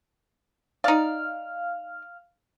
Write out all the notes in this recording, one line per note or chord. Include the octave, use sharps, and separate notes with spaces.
D#4 D5 F5 F6